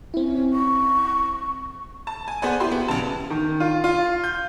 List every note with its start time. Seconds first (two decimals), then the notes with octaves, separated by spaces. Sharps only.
0.14 C4 C#4 E4
0.53 C#6
2.07 A5
2.28 G#5
2.42 B3 G#4 C5 D5 F#5 G#5
2.60 E4 G4 C6
2.71 B3 F#4 G#4
2.88 A#1 C#3 A5
3.30 D#3
3.60 F4
3.84 F4
4.24 G6